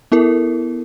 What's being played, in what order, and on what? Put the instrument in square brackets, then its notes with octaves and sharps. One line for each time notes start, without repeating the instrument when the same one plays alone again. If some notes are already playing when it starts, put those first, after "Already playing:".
[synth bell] B3 E4 A4 A#4